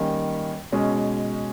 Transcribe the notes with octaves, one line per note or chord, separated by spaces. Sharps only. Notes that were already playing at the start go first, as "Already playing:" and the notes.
Already playing: D#3 G3 A#3 C#4
B2 G#3 C#4